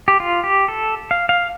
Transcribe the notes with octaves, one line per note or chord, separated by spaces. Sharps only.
G4
F4
G4
A4
F5
F5